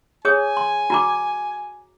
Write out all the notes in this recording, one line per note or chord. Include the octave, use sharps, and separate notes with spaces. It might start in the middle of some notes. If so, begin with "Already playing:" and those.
G#4 C#5 G#5 D#6
C6
F#4 A#5 D6